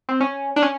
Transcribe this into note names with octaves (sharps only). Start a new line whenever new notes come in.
C4
C#4
D4
C#4